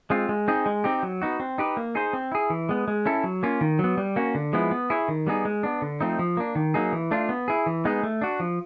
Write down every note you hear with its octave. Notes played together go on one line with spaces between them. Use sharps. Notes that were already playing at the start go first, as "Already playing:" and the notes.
G#3 C4 F4
G#3
C4 D#4 G#4
G#3
C4 D#4 G4
F#3
B3 D#4 F#4
C4
D#4 G4 B4
A#3
D#4 G#4 C5
C4
E4 G#4
E3
G#3 B3
G#3
C#4 E4 A4
F#3
A#3 C#4 F4
D#3
F#3 B3
G3
A#3 C#4 F#4
D3
F3 G#3 B3 E4
B3
E4 G#4 C#5
D#3
G3 B3 D#4 G#4
G#3
B3 D4
D3
F3 A3 C4 D#4
F3
A#3 D4
D#3
F#3 A#3 D#4 G#4
E3
A3 D4 F4
B3
E4 G#4
E3
G#3 B3 D#4 G#4
A3
D4 F#4
F3